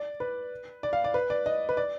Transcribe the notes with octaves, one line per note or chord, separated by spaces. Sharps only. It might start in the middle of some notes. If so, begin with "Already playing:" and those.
Already playing: D5
B4
D5
F5
D5
B4
D5
D#5
B4
D5